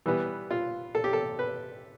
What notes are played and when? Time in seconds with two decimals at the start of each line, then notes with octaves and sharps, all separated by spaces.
0.06 E3 G3 B3
0.51 F4
0.95 A4
1.04 G4
1.13 A4
1.39 B4